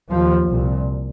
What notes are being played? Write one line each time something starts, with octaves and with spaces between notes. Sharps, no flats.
D#2 F3
C2 A#2